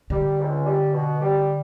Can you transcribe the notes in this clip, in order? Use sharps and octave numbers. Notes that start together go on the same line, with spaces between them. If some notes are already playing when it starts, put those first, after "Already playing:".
D3 G3
C#2
G3
B2
G3